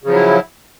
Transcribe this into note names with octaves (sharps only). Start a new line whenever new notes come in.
C#3 F3 F#3 E4